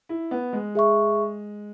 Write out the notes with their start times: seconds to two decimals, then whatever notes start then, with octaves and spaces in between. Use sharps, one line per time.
0.09 E4
0.31 B3
0.53 G#3
0.75 G#4 E5 C#6